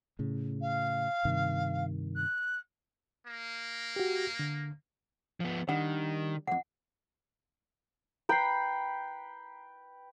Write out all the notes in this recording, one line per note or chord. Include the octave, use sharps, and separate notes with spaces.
A2 C#3
F5
G2 C3 D#3
F#6
A#3
F#4 G4
D3
F3 B3
D#3 G3 D4 F#5
B1 F2 F#5
B4 G5 A#5 B5 C7